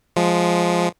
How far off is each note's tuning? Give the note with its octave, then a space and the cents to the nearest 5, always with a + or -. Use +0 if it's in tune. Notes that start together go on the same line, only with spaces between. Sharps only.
F3 +0 G#3 +0